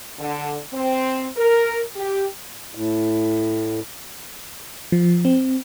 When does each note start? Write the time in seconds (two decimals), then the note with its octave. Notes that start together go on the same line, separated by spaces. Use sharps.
0.18 D3
0.73 C4
1.37 A#4
1.96 G4
2.75 A2
4.92 F3
5.25 C4